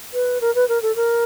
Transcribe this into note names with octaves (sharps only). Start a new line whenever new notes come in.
B4
A#4
B4
A#4
A4
A#4